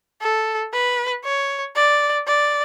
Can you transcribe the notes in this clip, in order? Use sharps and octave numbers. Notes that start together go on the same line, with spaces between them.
A4
B4
C#5
D5
D5